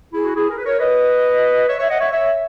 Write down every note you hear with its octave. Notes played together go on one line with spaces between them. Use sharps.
E4 G#4
F#4
E4 G#4
A#4
B4
A#4 C#5
B4 D#5
C#5 E5
C#5 E5
D#5 F#5
C#5 E5
C#5 E5